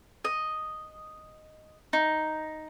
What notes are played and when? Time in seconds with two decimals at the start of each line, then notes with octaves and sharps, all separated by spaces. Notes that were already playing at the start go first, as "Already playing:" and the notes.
0.25 D#5
1.93 D#4